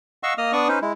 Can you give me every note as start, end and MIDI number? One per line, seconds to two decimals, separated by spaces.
0.23 0.34 75
0.23 0.34 77
0.23 0.34 78
0.23 0.34 85
0.23 0.34 88
0.38 0.53 58
0.38 0.53 75
0.38 0.53 87
0.38 0.53 89
0.53 0.68 59
0.53 0.68 62
0.53 0.68 74
0.53 0.68 85
0.53 0.68 87
0.68 0.79 61
0.68 0.79 63
0.68 0.79 71
0.68 0.79 72
0.82 0.93 56
0.82 0.93 64